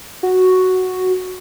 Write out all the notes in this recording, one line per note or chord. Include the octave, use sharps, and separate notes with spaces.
F#4